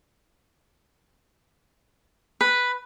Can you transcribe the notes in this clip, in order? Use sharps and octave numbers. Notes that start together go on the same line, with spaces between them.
B4